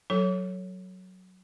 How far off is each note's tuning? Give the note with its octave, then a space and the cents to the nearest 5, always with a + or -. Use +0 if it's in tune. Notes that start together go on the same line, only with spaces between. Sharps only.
F#3 +0 A4 +0 C#5 +0